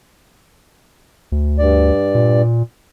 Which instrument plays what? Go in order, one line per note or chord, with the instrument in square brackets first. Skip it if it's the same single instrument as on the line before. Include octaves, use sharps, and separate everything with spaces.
[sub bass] D2
[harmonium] G2 D5
[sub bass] A#2